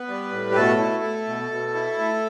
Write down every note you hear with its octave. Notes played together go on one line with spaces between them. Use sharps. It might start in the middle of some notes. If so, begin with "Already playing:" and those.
Already playing: B3 B4
G3
A2
G4
B2 A3 A4
E4
A3
B2
B2
E4
A3